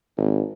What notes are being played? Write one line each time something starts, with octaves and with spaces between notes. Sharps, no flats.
G#1